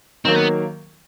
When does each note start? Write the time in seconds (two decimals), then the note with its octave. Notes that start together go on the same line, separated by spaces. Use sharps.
0.25 D#3 F#3 A#3 C4
0.36 B3